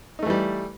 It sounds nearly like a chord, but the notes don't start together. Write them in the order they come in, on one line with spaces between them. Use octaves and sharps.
D#4 A3 E3 G3